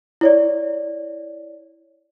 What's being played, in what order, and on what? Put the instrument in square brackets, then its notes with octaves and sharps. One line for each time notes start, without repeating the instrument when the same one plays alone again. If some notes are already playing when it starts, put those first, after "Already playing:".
[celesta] E4 C#5 D5